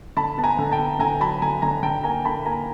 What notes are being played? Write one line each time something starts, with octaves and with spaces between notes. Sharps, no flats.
D3 A5 B5
B3 A5
G#5 A#5
D3
G5 A5
B3
D3 G#5 A#5
F#3 A5 B5
D3 G#5 A#5
D3 G#5 A#5
D3 G5 A5
A#3 G#5 A#5
D3 A5 B5
A#3 G#5 A#5